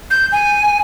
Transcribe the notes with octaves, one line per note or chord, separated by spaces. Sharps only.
G6
G#5